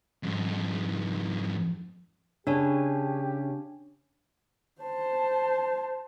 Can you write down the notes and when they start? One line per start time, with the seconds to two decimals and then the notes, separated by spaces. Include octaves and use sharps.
0.23 F2 G#2
2.47 C#3 D4 G4 C#5 G#5
4.82 C5 A5